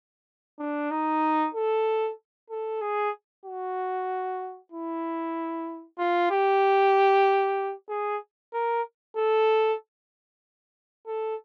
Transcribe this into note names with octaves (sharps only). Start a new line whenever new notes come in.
D4
D#4
A4
A4
G#4
F#4
E4
F4
G4
G#4
A#4
A4
A4